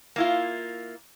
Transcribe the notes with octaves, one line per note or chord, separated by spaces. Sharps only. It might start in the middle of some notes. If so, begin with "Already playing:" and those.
A#3 E4 F4